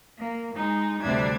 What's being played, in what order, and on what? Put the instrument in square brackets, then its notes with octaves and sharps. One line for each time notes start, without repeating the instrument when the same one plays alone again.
[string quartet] A#3
G#3 D#4
D2 C3 G3 D4 E5 G#6